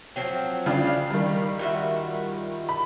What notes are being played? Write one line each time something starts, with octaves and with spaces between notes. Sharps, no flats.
F3 F#3 C4
C#3 F3 D4 F5 G5
D#3 G3
F4 F#4 E5
B5